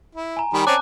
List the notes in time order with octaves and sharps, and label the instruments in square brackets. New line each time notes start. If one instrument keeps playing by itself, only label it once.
[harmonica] E4
[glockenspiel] G#5 A#5
[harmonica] D#3 G3 B5
[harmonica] C4 C#4 D5 [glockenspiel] A5 D6 F#6